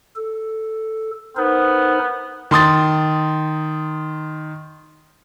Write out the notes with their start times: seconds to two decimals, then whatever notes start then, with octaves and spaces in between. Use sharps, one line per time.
0.16 A4
1.37 B3 D#4 A#4 C5
2.51 D#3 C6 D#6 A6